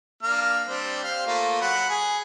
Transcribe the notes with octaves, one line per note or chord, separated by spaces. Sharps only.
A#3 D4 F6
G3 C4 D4
C4 F5
A3 A#3 F4
F#3 F#5 B5
G#4